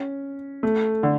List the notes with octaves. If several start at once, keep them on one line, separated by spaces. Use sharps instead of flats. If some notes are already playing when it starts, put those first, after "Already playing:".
Already playing: C#4
A3
D3